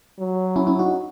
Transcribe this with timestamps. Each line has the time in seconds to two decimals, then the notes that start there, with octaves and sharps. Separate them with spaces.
0.19 F#3
0.56 C#4 E4
0.67 C#4 E4
0.79 D#4 F#4